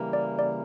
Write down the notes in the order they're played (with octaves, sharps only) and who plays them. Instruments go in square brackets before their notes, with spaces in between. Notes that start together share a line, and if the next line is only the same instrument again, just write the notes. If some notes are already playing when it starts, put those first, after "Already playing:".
Already playing: [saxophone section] C#3 E3 G3 A#3
[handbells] D5
D5